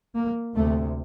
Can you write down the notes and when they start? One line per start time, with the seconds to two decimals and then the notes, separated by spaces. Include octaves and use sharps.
0.15 A#3
0.56 D2 C3 A3